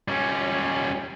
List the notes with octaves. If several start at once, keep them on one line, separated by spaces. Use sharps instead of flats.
G3 C#4